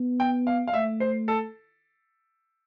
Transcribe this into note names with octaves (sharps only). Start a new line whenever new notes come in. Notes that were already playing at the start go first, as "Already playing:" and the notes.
Already playing: B3
G5
F5
F5
A3 E5
C5
A4